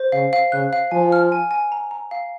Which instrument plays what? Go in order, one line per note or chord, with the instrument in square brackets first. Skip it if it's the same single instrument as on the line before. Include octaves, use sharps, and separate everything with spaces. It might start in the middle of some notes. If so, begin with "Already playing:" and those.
Already playing: [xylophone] C5
[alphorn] C#3 [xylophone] F5
[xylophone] F5
[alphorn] C#3 [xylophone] F#6
[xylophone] F5
[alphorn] F3 [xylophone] G#5
[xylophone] F6
G#5
G#5
A#5
A#5
F5